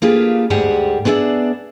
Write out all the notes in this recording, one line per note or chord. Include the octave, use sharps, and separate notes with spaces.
A#3 D4 F4 G4 G#4 B4
D2 G#2 G3 G4 G#4 F#5
B3 D4 G#4 D5 E5